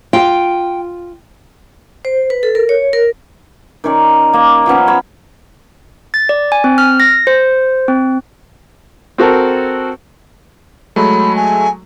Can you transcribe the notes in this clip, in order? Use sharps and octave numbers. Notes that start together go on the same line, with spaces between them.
F4 G5
C5
B4
A4
A#4
C#5
A#4
D#3 C#4 C#5 D5
A#3
F3 B3 C#4
C#5 B5
A6
D5
G#5
C4
F6
A#6
C5
C4
C4 F#4 A4 A#4
F#3 G#3 A3 B5
G#5